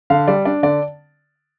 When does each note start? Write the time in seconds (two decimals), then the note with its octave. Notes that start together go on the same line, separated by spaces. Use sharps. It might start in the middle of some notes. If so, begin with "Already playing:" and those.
0.10 D3 F5
0.28 G3 D5
0.45 D4 D5
0.63 D3 D5